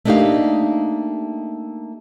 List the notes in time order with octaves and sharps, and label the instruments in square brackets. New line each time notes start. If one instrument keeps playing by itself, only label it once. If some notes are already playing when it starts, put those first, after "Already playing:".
[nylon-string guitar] A3 A#3 D4 D#4 G4 F5